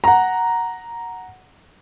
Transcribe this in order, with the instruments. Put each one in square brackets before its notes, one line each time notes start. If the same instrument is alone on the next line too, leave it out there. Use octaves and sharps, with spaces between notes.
[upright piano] F#5 A#5